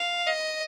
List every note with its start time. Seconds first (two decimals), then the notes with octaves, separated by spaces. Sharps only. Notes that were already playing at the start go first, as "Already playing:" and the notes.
Already playing: F5
0.27 D#5